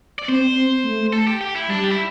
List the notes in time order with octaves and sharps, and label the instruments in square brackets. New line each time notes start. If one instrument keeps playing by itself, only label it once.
[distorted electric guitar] D5
[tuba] C4 [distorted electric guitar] C5
[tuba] C4
A3
[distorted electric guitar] A4
G4
G4
E4
[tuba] G3 [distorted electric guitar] D4
[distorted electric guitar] G4
E4